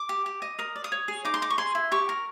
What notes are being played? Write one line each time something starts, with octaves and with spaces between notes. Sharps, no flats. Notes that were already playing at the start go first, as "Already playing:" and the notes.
Already playing: D6
G4
G4
D#5
A#4 D#6
D5
D#6
C#5
G#4
D#4 D6
C6
D#4 D6
C#6
G#4 C6
E4
G4 C#6
A#4